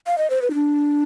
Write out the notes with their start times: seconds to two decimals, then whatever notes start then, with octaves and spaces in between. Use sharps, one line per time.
0.07 F5
0.18 D#5
0.30 C5
0.42 B4
0.50 D#4
0.54 D4